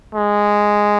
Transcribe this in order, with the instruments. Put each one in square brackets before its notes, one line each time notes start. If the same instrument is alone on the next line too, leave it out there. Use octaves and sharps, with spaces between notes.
[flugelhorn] G#3